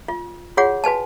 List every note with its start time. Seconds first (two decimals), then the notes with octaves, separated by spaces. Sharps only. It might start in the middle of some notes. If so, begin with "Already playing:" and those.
0.08 F4
0.57 F4 F#4 G#4 C#5 F#5
0.84 F#4 B4 G#5 A5